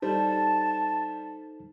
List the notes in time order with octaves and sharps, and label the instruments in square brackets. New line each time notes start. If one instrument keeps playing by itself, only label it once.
[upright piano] G3 [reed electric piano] D#4 A4 C5 [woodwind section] A5